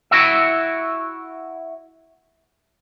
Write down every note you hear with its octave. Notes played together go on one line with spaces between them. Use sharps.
E4 F#4 E5